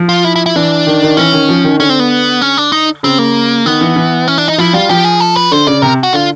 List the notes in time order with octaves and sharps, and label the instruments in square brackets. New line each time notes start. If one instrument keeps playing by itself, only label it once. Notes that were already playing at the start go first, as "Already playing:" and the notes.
Already playing: [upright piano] F3
[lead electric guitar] F4
E4
E4
E4
[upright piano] E3 [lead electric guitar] D4
[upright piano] D#3
D#3
[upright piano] E3 [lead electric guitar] C#4
[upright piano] D#3
F3
D#3
[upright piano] D3 [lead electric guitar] C#4
[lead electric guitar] C4
B3
C#4
D4
D#4
[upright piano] C#3 [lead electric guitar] C4
[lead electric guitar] A#3
[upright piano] D#3 [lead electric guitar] B3
[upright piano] E3
E3
[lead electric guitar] C#4
D4
D#4
[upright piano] F3 [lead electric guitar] E4
[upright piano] G3 [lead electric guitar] F4
[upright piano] F3 [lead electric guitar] G4
[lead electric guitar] G#4
A4
B4
[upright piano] D3 [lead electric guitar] C5
[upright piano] C#3 [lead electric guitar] D5
[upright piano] C3 [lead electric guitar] A#4
[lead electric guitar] F#4
[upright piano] D3 [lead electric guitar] F4